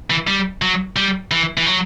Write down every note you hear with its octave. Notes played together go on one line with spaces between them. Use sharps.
E3
G3
F#3
G3
E3
E3
F#3